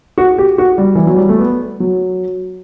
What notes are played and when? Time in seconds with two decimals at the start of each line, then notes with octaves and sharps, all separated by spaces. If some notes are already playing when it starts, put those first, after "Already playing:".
0.18 F#4
0.38 G4
0.58 F#4
0.78 G3
0.95 E3
1.07 F#3
1.17 G3
1.29 A3
1.39 B3
1.80 F#3